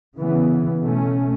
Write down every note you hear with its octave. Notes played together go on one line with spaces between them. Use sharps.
C#3 E3 B3
B2 A3 C#4